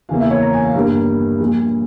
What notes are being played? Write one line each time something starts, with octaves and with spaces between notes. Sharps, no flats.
E2 C#3 E3 A#3 F5
E5
C#5
A#5
G#5
F5
G1 G2 G3 A#3 A#4
A#1 A#2 G3